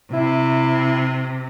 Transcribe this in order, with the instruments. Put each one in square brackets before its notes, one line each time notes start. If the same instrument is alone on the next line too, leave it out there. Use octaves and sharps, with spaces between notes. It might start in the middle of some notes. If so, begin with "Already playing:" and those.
[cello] C3 [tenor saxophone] E4